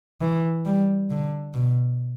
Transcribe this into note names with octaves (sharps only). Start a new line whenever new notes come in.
E3
G3
D3
B2